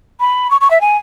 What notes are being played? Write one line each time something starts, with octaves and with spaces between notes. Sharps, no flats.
B5
C#6
C#6
E5
G#5